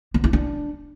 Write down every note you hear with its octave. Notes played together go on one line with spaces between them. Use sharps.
B3
E4
D4